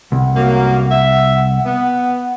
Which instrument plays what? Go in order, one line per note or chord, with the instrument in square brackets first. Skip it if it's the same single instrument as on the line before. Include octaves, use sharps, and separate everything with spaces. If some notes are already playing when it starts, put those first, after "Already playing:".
[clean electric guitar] C2 [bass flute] F#5
[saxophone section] F#2 A2 A#3
E5
B3